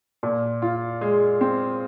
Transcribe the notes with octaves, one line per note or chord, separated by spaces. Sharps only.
A#2
F4
G#3
C4